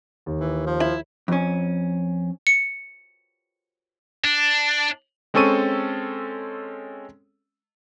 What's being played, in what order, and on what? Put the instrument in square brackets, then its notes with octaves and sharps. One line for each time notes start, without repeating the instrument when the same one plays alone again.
[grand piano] D#2
[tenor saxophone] E3
F3
[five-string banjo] E4
[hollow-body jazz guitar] F2 C#4
[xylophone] C#7
[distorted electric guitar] D4
[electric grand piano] G#3 C4 C#4 A4 C#6 D#7